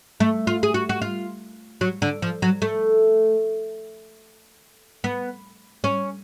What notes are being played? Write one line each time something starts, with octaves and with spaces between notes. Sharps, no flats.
A3
F4
G#4
F#4
F#4
F4
F#3
D3
F3
F#3
A3
B3
C#4